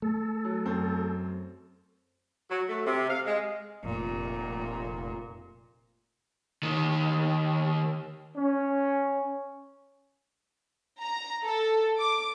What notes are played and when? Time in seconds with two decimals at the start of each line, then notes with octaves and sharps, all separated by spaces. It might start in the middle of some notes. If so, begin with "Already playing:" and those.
0.02 A3 A4
0.44 F#3
0.65 F#2 C4
2.50 F#3
2.68 A3
2.86 C3
3.10 F5
3.26 G#3
3.84 F1 A#2
6.63 D#2 D#3
8.36 C#4
11.00 A#5
11.43 A4
11.98 D6